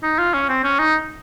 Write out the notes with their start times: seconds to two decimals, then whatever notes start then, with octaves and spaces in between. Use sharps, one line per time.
0.03 D#4
0.19 F4
0.34 C#4
0.49 C4
0.64 C#4
0.79 D#4